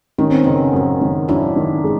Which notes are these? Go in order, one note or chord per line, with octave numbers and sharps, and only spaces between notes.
D#3 C#4
C4
F#1 B3 C#4
F#2
D#3
F#2 D4 E4
D#3
G#3